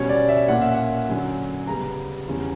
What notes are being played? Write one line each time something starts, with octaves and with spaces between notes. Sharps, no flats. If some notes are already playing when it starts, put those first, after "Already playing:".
Already playing: B2 G3 C#4 C#5
D5
E5
A#2 A#3 C#4 F#5
E5
F#5
F#2 D3 F#3 C#4
C#3 G3 B3 A#5
E2 C#3 G3 C#4